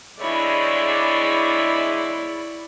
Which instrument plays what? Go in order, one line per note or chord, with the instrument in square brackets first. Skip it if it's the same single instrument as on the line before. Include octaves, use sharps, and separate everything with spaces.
[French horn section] E2 D3 G#3 [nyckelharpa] E4 D5 [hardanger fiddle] C#5 B5